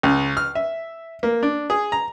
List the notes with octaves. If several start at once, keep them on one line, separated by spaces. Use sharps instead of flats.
C#2
F6
E5
A#3
D4
G#4
A#5